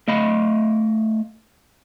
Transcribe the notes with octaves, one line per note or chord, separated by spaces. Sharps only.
A3 D#5 F5 B5